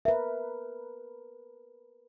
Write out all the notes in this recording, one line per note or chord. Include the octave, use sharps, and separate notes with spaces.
A#4 B4 E5